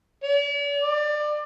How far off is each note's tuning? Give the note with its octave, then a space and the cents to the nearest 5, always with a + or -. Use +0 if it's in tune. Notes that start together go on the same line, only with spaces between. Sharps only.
D5 -45
D5 +25